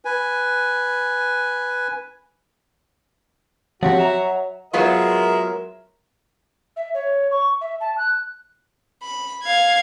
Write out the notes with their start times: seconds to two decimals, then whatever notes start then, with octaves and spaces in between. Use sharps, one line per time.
0.05 B4 G#5
3.83 F3 F#3 C4 F#4 G4
3.99 E5 A#5
4.73 F#3 G#3 B3 F4 A#4 E5
6.76 E5
6.94 C#5
7.31 C#6
7.61 E5
7.80 A5
7.98 F#6
9.03 B5
9.43 F5 G#6